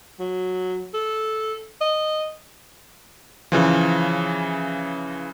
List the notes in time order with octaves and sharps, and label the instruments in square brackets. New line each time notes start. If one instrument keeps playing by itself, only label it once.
[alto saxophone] F#3
A4
D#5
[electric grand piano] C#3 E3 F3